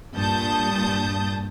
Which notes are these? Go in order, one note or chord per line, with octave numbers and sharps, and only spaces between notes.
G2 A#2 A5 D#6 G6